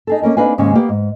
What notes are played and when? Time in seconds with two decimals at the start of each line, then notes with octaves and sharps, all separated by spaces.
0.07 D#4 G#4 A4
0.22 A#3 C#4 A#4 G#5
0.37 C4 D4 D#4 B4 F5 G#5
0.58 D#2 G#2 C#3 G#3 C#4
0.75 A#3 B3 G4 F5
0.89 G#2